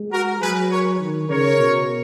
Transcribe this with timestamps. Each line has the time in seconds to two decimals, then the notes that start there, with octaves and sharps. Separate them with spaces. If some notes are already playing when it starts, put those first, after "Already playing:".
Already playing: G#3
0.12 F#4 A#4
0.42 F#3 G#4 B4
0.71 A#4 C#5
1.01 D#3
1.29 C#3 A#4 C#5
1.59 B2